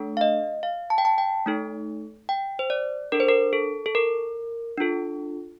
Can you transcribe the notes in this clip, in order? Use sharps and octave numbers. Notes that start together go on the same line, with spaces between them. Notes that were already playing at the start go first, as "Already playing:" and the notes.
Already playing: A3 D4 A4
F5
D#5
F5
A5
G5
A5
G5
A3 D#4 A4
G5
C5
D5
D4 A4 A#4
C5
A#4
A4
A4
A#4
D4 F4 A4